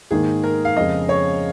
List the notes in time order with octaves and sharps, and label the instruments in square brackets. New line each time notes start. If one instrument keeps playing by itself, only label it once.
[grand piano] G#2 D#3 A#3 D#4 [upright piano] G#4
[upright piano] A#4
F5
[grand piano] F2 C#3 G#3 [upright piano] D#5
[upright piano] C#5